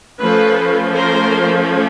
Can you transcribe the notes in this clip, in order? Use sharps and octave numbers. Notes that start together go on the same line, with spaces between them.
F3 A3 C#4 A4 B4
A#4 C5